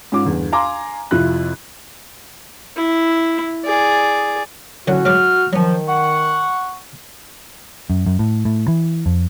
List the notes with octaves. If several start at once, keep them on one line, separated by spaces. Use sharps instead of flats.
G#2 C#4 F4 D6
G1 E2
F5 G#5 A#5 C6 D6
F2 C3 E4 F4 F#6
E4
G#4 D5
A2 D3 F#3 C#4 F#4 F#5
G#2 F#3 D6 F6
D#3 F3 F#3 C#4
F#5 C#6
F#2
F#2
A2
A2
E3
F2